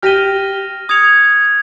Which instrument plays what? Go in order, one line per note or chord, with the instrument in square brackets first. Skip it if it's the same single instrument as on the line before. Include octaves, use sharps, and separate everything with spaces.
[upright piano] G4 [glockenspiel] F6 A#6 D#7 G7
[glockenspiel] D#6 G#6 C#7 F7